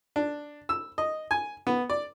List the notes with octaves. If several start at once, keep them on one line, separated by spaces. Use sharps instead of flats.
D4
E6
D#5
G#5
B3
D5